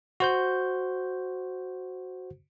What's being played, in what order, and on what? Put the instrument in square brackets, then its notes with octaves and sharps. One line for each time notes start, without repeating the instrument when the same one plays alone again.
[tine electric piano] F#4 C5 G6